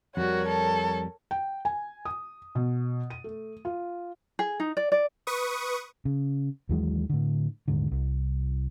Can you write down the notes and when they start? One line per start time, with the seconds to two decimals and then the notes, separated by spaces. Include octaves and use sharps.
0.17 F2 G3 F#4 A#4 C#5
0.48 A4
1.31 G5
1.65 G#5
2.05 D#6
2.55 B2
3.10 D#7
3.24 A3
3.65 F4
4.39 G#4
4.60 D#4
4.77 D5
4.92 D5
5.27 B4 C#6 D#6
6.05 C#3
6.69 D#2 E3 F#3 G#3
7.10 A2 D3
7.68 D#1 G#2 D3
7.91 C2